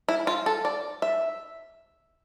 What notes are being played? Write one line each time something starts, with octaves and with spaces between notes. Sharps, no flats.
E4
F4
A4
D5
E5